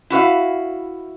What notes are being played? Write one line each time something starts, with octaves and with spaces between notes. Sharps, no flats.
E4 F#4 B4 F5